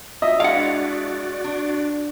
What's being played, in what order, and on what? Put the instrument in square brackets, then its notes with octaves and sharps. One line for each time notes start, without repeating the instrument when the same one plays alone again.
[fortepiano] D#5 E5
[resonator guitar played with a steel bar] G#3 D4 E4 [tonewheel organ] F#4 D5 [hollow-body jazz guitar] F5 F#5
[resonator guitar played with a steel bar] D4